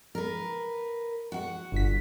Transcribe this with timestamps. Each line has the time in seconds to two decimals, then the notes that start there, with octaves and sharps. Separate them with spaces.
0.15 A#4 B4
1.32 F#4 F#5
1.72 G1 B6